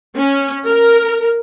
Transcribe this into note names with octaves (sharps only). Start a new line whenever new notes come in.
C#4
A#4